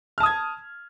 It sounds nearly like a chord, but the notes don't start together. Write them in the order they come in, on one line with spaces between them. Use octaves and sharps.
F6 A5 D#6 G#6